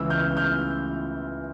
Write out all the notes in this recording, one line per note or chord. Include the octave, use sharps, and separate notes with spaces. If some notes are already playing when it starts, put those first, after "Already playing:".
Already playing: C#2 C#3 E3 E6
F6 G6
F6 G6